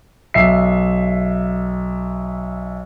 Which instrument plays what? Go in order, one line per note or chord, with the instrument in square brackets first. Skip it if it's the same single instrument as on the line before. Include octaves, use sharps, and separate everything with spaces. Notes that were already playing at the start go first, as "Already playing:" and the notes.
[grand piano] B1 E5 C7